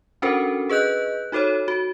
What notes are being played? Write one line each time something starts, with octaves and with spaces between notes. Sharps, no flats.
C#4 D4 F#4 A4 A#4 C5
G#4 B4 D#5 F#6 G6
D#4 F#4 A4 C5 C#5
F#4